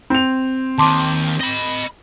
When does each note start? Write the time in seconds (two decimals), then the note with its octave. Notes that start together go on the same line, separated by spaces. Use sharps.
0.10 C4 F7
0.78 D#2 D#3 A5 C6 D6
1.40 D#5 B5